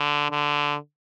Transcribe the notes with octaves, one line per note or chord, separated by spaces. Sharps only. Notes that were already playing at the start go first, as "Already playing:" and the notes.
Already playing: D3
D3